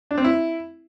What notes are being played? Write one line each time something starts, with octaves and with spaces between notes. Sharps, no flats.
D4
C4
E4